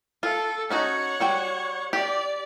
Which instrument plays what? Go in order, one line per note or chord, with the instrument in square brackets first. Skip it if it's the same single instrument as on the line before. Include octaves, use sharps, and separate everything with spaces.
[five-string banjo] F4 [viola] A4
[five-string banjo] C#4 D#4 F#4 [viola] C#5 F#5
[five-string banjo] G3 F#4 G5
[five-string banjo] G4 [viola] D5